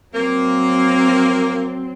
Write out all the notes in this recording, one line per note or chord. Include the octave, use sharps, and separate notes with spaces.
F#3 A#3 C4